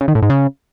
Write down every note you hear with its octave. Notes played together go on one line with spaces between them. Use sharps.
C#3
D#3
A2
G#2
C#3